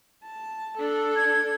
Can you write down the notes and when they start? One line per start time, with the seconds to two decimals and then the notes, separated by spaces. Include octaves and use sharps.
0.24 A5
0.78 D4 A4
1.16 G#6